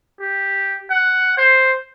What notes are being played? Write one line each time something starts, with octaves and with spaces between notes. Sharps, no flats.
G4
F#5
C5